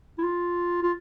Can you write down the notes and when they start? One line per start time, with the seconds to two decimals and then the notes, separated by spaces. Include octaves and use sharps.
0.18 E4
0.23 F4
0.83 F4